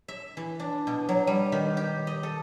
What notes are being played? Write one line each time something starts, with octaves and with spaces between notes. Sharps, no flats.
E5
E3
D4
B2
F#3
G3
D#3
G4
D#5
A4